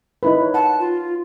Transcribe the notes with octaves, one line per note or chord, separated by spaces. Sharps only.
D#4 E4 B4
C#5
F#5 A5
F4